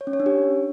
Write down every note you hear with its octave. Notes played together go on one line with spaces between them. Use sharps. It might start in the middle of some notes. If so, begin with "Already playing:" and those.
C#5
C#4
C#5
D4
G4